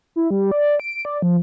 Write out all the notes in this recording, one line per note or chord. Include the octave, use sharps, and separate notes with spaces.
E4
G3
D5
D7
D5
F3